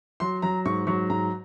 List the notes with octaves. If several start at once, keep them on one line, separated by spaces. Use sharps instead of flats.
F#3 C6
F#3 A#5
G#2 C#6
F#3 C#6
G#2 A#5